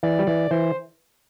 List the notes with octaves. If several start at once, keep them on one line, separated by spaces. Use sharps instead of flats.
E3 D5
G3
E3 D5
E3 C5